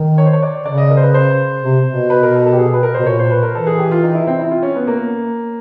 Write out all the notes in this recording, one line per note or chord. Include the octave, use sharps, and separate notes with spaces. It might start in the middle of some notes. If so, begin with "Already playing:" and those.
Already playing: D#3
C#5
C5
C#5
D5
C#3 D5
D#5
A#4
C5
B4
C5
C3
B2
B4
A#4
A4
A4
G4
G#4
B4
A#4
B2 C5
A#2 C#5
C5
B4
A#4
E3 A4
G#4
G4
F4
D#4
E4
C4
E4
F4
C#4
B3
A#3